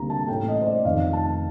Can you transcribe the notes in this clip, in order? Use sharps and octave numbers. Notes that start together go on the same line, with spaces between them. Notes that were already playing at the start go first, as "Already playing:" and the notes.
Already playing: D2 C3 G3 A#3 A#5
A5
A1 A2 A3 G5
D#5
C5
D5
F1 F2 D#3 F5
A5